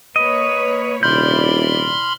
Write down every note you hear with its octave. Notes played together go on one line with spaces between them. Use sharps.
A#3 B4 C#5 D#5
D#1 C3 E4 D5 B5 C6 F6 G6